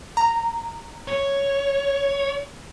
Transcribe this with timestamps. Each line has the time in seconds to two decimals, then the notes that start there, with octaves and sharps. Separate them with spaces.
0.17 A#5
1.08 C#5